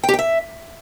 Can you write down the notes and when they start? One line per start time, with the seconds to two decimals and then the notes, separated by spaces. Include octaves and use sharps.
0.03 G5
0.09 G4
0.14 G5
0.19 E5